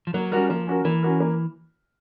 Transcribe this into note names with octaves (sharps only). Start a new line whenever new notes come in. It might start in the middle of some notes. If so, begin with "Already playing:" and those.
F3
F#3 A#3
G3 C#4 F#4 A#4
F3 A#3
C#4 F#4 A#4
E3 A#3
C#4 F#4 A#4
A#3